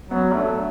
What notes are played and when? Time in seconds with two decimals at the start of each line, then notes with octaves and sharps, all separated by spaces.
0.10 F#3 B3
0.34 A3 D4